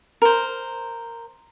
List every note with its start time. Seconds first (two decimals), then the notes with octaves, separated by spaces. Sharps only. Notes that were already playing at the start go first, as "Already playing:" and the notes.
0.22 A#4 C5